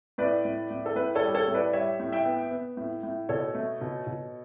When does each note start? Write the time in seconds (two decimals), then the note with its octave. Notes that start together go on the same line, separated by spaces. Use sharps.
0.18 A2 B4 D5
0.45 A2
0.70 A2
0.86 A4
0.95 A2 B4
1.15 A4 C#5
1.21 G3
1.35 A4 C#5
1.48 A2
1.54 B4 D5
1.73 G3 C#5 E5
2.00 A2
2.12 E5 G5
2.25 B3
2.51 B3
2.77 A2
3.03 A2
3.29 B2 A4 C#5
3.55 A3
3.81 B2
4.07 B2